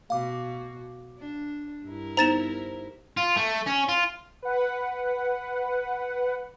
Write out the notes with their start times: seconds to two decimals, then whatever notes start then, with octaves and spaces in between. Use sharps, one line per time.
0.10 B2 F#4 F5 D6
1.19 D4
1.86 G2 E4 A#4
2.17 B3 D#4 C5 A#5 A6 E7
3.17 F4
3.36 A3
3.66 C#4
3.89 F4
4.42 B4 F#5